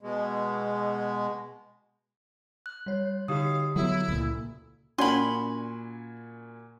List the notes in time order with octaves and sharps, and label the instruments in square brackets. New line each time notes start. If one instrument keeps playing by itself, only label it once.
[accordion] B2 G#3
[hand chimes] F#6
[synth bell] G3 C#5
[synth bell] D3 F#4 [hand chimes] D#4 G4 D#6 [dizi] F5
[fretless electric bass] F#3 B3 [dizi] E4 [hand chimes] A4
[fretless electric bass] C#2 A#2
[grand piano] A#2 F#4 G#5 [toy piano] C#4 D5 F#5 [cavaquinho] B5 C6